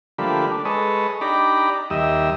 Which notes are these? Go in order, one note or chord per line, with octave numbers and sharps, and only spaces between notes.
D3 F3 G3 A3 A#3 B5
D4
G#3 A4 B4 C#5 D#5
D4 D#4 G4 D5 A#5 B5
D#2 G3 D#5 E5